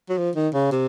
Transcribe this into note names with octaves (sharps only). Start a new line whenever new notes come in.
F#3
F3
D#3
C#3
C3